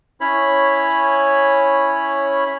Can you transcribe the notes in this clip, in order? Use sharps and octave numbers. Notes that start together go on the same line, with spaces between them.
C#4 E4 C#5 B5